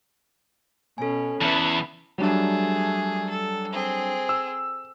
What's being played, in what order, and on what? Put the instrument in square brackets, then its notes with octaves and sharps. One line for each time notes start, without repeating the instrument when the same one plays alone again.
[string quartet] B2 C#4 [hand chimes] A4 G#5
[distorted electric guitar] E2 [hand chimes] C#4 A5 [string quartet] B4 E5 E6
[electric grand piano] F#3 G3 D4 [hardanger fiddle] A3 G#4
[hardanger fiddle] A4
C4 G#4
[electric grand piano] E6